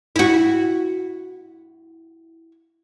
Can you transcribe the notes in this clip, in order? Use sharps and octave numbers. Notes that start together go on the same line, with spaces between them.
E4 F#4